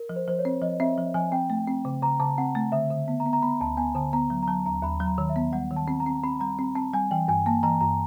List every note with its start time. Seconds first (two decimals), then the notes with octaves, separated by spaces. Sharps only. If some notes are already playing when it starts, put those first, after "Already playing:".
Already playing: A#4
0.09 F3
0.16 C5
0.28 F3 C5
0.39 C#5
0.45 C4
0.62 F3 D#5
0.80 C4 E5
0.98 F3
1.14 F3 G#5
1.32 C4 G5
1.50 A3
1.68 C4
1.85 C#3
2.03 C#3 A#5
2.20 C#3 A5
2.38 C4 F#5
2.55 A3
2.72 D3 E5
2.91 D3
3.08 B3
3.20 A#5
3.26 B3
3.33 A#5
3.42 B3 B5
3.61 D2 A5
3.77 B3 G#5
3.95 D3 A5
4.13 B3 A#5
4.30 F#3
4.43 A#5
4.48 F#3 A5
4.66 D#2 A#5
4.82 D#2 B5
5.00 F#3
5.06 A#5
5.18 D#3
5.29 E5
5.36 B3
5.53 G3 F#5
5.71 D#3
5.76 A5
5.88 C4
6.00 A#5
6.06 C4
6.24 C4 B5
6.40 G3 A#5
6.59 C4
6.75 C4 A5
6.93 G3 G#5
7.11 E3 G5
7.28 G2 G#5
7.46 A#3 A5
7.63 E3 A#5
7.80 G2 A#5